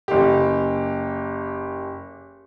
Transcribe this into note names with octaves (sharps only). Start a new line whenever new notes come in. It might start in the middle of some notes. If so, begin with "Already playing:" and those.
F#1 G4